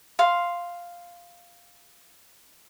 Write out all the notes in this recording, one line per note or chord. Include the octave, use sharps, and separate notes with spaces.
F5 C6